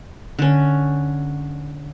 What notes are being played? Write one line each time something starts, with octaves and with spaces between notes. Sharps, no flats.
D3 C#4